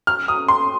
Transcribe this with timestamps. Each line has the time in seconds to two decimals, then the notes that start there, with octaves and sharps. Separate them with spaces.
0.07 F6
0.28 D#6
0.48 C6